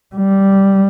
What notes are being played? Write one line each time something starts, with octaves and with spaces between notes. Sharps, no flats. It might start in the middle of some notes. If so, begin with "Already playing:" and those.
G3